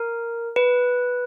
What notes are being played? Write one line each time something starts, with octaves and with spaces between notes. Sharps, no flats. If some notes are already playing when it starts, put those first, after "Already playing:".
Already playing: A#4
B4